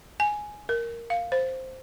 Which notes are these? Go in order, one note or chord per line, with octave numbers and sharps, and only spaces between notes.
G#5
A#4
F5
C5